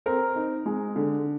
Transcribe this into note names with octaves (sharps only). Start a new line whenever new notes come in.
C4 A#4
D#4
G#3
D3